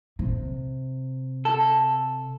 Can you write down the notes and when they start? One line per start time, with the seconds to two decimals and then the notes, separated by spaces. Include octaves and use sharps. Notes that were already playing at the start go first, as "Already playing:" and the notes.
0.19 C3
1.45 A4